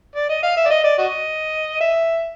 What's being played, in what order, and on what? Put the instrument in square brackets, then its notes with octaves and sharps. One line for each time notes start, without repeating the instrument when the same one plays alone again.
[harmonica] D5
D#5
F5
E5
D5
D#5
D5
F#4 D#5
E5